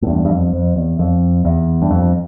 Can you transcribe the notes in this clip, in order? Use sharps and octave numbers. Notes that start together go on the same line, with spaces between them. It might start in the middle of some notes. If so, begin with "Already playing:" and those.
A2
E2 G2
G2
F2
F2
E2
F2
E2
G2
F2